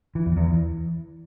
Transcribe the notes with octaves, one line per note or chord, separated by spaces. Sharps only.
E3
E2
E2
E3